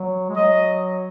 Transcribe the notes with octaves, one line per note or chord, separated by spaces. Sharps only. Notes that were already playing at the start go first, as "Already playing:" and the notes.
Already playing: F#3
G#3
F#3 D#5